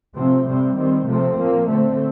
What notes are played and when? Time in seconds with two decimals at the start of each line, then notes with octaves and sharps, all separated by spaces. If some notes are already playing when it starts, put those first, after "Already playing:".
0.15 C3 F3 A3 C4
0.46 C3 G3 C4
0.75 D#3 G3 C4
1.06 C3 F3 A3 C4
1.37 A#2 F3 A#3
1.68 D3 A3 C4